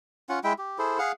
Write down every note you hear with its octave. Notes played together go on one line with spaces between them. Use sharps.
C#4 F4 F#5
G#3 E4 E5 G5
G4
E4 G#4 A4 C5
G#4 F5 F#5